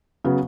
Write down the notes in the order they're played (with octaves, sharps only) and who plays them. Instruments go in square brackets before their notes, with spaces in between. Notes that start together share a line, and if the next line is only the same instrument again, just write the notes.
[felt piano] C#3 F#3 B3